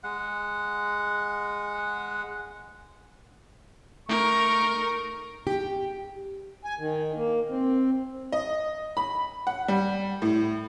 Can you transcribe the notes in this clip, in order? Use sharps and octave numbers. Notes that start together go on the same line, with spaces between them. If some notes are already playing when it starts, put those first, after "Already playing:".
G#3 F#5
A3 D#4 A#4 C#6
G4
G#5
D#3
A#3
C4
D#5
B5
F#5
G3
A2